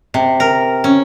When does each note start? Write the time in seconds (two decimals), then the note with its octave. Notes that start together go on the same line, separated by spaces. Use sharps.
0.14 C3
0.40 A#4
0.84 C#4